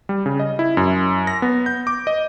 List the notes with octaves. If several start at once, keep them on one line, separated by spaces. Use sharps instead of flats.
G3
C#3
D#5
E4
F#2
A#6
B3
G6
D6
D#5